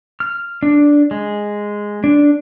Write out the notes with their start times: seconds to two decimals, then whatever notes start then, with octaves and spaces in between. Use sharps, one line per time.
0.20 F6
0.63 D4
1.11 G#3
2.04 D4